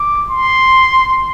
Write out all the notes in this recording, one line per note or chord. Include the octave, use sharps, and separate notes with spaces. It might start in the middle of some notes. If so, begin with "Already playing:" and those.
Already playing: D6
C6